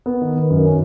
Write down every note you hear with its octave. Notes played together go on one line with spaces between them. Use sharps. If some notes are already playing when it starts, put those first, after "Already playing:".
B3
D#3
D#3
F#2
C#4